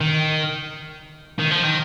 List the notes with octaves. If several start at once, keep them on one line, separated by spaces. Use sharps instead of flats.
D#3
D#3
F3
D#3